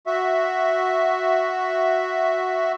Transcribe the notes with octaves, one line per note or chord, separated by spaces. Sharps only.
F#4 E5